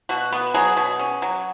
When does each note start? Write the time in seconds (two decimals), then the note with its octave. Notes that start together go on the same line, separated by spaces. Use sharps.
0.09 B2 F#4
0.33 B3
0.54 F#3 G#4
0.77 B2
0.99 C#4
1.22 F#3